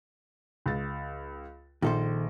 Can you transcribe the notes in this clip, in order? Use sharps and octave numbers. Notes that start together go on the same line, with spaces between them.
C#2 A6
A#1 D#3 A4 C5